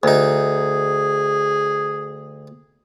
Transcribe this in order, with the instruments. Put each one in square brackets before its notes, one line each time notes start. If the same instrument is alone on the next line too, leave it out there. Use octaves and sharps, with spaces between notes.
[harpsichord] D2 D#4 [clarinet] G#4